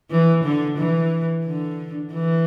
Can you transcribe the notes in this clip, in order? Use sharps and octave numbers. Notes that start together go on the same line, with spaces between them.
E3
D3
E3
D3
E3